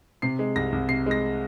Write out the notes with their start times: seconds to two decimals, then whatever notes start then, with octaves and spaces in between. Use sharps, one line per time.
0.22 C3 C7
0.39 G#3
0.56 C2 A#6
0.72 C2
0.89 C3 C7
1.06 G#3 A#6